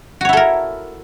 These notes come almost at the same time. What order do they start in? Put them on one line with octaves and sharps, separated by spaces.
F#4 C#5 E4 A4 A#4